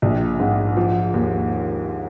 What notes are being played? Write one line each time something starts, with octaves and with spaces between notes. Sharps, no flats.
A#1
G#2
F3
D#2